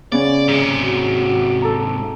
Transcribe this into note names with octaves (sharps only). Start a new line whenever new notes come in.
C#3 B3 C#4 D5
G#2 C3 G#4
F#4
A4 A#5